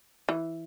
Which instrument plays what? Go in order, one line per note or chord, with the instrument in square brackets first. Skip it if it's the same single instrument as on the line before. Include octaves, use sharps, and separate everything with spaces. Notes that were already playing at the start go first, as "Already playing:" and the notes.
[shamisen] E3